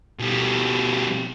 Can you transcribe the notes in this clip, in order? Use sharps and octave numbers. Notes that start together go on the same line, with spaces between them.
B2 G3